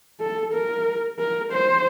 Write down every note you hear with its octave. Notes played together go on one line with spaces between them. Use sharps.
A4
A#4
A#4
C5